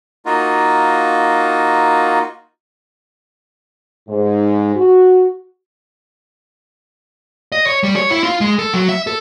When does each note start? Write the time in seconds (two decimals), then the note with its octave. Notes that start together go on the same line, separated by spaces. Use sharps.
0.26 A#3 D#4 F4 F#4
4.08 G#2
4.75 F#4
7.52 D#5
7.67 C#5
7.83 G3
7.96 C#5
8.10 E4
8.24 F4
8.41 G#3
8.59 A4
8.74 F#3
8.89 E5
9.07 A4